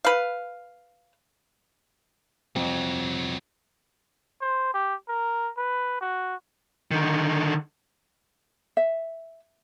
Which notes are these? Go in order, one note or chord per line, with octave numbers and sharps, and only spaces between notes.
B4 F5
C2 F2 F#3
C5
G4
A#4
B4
F#4
D3 D#3
E5